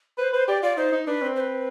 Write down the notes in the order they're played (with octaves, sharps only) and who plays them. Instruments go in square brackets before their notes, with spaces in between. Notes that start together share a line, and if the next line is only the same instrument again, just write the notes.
[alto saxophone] B4 [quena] C5
[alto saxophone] B4 [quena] C5
[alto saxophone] G4 [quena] D5
[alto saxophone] F4 [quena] D5
[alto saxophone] D#4 [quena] C5
[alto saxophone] D#4
[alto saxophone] D4 [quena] B4
[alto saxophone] C4
[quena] C5
B4